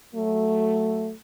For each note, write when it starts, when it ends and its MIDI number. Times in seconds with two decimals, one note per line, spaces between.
0.14 1.12 54
0.14 1.12 57